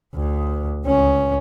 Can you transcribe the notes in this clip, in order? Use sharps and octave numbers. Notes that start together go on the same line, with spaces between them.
D2
C#2 C#4